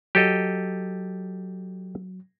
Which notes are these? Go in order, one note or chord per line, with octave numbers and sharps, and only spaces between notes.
F#3 G4 A4 D#5